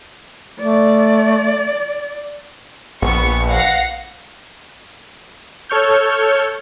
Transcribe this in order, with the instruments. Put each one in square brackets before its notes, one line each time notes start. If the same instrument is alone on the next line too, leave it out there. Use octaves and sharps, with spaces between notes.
[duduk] A3 [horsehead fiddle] D5
[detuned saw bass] A#1 [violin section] B3 C#6
[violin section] F5 F#5 A#6
[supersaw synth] A4 C#5 C#6 F6 G6